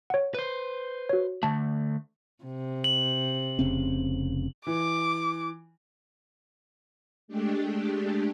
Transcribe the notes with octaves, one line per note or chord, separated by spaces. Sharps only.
C#5 F#5
B4 C5
F#4 C#5
D3 A3 A5
C3
F#7
F1 C#3 C4
E3 D6
G#3 A3 D4 G4